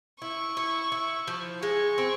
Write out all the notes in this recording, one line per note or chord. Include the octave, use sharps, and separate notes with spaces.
E4 C#6
E4
E4
F3
G#3 C#6
C4